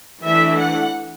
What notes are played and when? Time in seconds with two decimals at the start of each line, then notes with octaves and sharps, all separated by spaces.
0.22 E3 A3 D4 E5
0.59 F#5